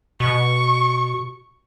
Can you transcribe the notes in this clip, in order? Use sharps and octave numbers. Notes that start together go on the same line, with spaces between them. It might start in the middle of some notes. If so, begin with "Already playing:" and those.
B2 C#6